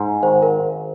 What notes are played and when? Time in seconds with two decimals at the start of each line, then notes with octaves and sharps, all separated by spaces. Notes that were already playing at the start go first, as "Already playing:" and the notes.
Already playing: G#2
0.23 G#1 C5
0.42 A#4